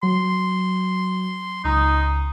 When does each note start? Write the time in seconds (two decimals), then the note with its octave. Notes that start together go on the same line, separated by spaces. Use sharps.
0.03 F#3 C6
1.64 C#2 D#4 A#5 D#6